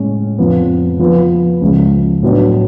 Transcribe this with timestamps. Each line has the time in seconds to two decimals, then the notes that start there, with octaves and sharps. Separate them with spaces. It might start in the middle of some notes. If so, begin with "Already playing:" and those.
Already playing: A2 G#3 C#4
0.38 F2 F3 B3
0.99 F3 B3 F4 B4
1.61 C#2 C#3 F3 G#3
2.22 A2 F#3 B3 D4